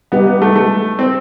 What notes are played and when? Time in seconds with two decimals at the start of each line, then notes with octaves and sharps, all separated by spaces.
0.12 G3 B3 D#4 G4 B4
0.27 B3
0.42 A3
0.56 A3
0.99 C4